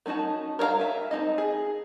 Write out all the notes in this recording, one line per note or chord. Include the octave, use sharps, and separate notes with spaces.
A3 C#4 D#4 F#4 A5
A#4 C#5 D5 F5 A#5
E5 G#5
C4 C#4 D#4 D#5
G#4